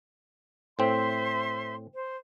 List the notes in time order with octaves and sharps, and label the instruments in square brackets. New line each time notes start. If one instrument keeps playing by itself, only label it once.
[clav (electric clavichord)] A2 C4 [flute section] C5 E5 C6
[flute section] C5